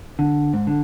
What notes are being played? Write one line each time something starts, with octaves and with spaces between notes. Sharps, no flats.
D3
G#2
D3